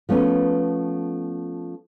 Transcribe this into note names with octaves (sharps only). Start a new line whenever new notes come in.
F3 A3 B3 C#4